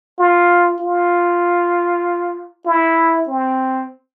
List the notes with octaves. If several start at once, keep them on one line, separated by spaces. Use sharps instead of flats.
F4
F4
E4
C4